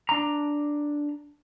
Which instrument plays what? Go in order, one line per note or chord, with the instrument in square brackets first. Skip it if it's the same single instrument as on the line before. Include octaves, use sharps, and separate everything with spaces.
[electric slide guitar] D4 A#5